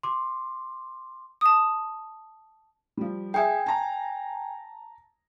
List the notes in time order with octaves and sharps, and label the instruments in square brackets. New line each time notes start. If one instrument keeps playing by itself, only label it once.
[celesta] C6 D6
[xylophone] A5 D#6
[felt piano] F3 G3
[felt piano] G#4 E5 [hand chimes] G5 G#5
[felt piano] A5 A#5